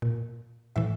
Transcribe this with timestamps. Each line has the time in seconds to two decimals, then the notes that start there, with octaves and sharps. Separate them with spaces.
0.02 A#2
0.76 A2 E3 E5